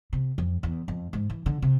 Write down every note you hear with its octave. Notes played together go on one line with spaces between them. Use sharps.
C3
F2
E2
F2
G#2
E3
D3
C3